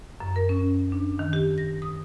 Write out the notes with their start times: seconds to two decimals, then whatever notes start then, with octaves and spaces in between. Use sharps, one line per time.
0.20 F#2
0.36 A#4
0.49 C#4
0.92 D4
1.19 D#3
1.33 G4
1.58 A#6
1.82 D#6